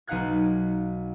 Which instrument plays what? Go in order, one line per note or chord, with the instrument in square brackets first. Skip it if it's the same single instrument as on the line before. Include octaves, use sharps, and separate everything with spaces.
[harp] B1 D#4 F5 F#5 F#6 G#6